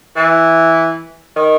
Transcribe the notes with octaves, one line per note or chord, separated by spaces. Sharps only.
E3
D#3